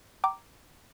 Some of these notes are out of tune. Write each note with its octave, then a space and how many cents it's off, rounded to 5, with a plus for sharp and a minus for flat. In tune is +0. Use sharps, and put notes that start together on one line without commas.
G5 -25 A#5 +0 D6 +0